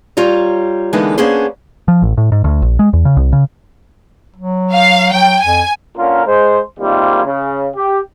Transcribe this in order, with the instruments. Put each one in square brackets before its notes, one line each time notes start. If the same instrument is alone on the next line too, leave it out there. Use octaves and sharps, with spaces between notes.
[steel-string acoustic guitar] G3 F4 C#5 A#5
D3 E3 G#3 A#3 B3 D#4
A#3 B3 C#4 D4 G#4 C5
[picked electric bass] F3
A1
A2
G#2
D2
A#1
G#3
E2
C#3
C2
C#3
[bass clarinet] F#3
[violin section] F5
[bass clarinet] F#3 [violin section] G5
[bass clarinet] F2 [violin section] G#5
[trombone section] D3 A#3 C#4 F4 A#4
G#3 C5
G#2 C3 D#3 G3 A#3 F4
C#3
G4